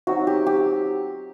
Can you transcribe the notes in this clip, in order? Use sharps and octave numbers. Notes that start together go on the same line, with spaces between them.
F#3 C4 D#4 F#4
G4
G4